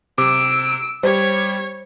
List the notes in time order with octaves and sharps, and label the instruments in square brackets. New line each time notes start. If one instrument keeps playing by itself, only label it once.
[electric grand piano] C3 [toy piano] D6 [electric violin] E6 D7
[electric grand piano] G3 G4 [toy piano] C5 [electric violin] C#5 G#6